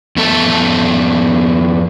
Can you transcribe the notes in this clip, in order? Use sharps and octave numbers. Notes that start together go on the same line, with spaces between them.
F2 B3 A4 E5 A5